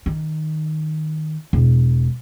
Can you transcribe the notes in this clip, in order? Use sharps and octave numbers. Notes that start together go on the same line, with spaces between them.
D#3
E1